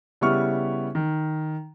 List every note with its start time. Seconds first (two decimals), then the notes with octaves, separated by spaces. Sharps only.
0.21 C#3 G3 B3 E4 C#6 F6
0.95 D#3